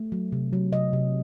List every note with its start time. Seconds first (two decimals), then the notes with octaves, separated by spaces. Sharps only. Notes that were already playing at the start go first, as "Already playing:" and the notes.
Already playing: A3
0.12 F#3
0.32 C3
0.53 F#3
0.72 C3 D#5
0.93 C3